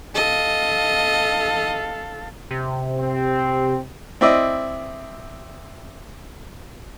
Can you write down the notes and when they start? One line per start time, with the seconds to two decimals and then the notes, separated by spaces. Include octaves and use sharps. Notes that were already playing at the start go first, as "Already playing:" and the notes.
0.15 A4 D#5 F5
2.50 C3
2.97 C4
4.21 C4 E4 D5 D#5